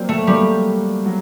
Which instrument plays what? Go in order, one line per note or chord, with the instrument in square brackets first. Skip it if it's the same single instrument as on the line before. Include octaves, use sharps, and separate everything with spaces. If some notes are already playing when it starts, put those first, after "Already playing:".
Already playing: [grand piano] F#3 A#3 D4 [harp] C4
[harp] A3
[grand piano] F#3 A#3 D4 [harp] G3
[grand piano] F#3